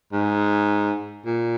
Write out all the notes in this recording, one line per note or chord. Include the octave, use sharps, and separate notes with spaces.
G#2
A#2